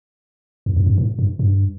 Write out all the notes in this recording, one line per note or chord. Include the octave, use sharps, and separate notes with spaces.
E2
F2
G2
A2
G2
G2